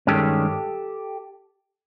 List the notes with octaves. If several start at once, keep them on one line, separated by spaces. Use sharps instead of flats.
G2 D#3 G#3 C#4 G4 A4